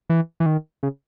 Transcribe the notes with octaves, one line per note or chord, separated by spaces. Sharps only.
E3
E3
D#3
C#3